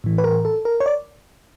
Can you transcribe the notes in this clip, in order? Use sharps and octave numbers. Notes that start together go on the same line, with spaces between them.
A2 E3
B4
A#4
A4
A#4
C#5
D5